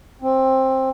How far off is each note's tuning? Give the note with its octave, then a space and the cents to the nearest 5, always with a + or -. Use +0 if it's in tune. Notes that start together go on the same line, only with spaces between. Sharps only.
C4 +15